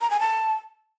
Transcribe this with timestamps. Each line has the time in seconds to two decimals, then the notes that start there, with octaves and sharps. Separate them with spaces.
0.01 A#5
0.10 G#5
0.20 A5